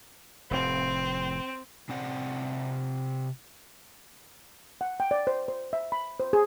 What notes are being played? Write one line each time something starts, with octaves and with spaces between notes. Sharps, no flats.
F1 A2 C4
C3 C4 D5 F#5
F#5
G5
D5
C5
C5
E5
B5
C5
G#4